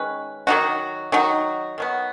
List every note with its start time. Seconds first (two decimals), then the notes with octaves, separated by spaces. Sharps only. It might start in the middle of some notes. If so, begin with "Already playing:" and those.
Already playing: D#3 G#3 C#4 B4
0.47 D#3 F#3 D#4 F#4
1.12 D#3 F#3 D#4 F#4
1.78 D#3 F#3 B3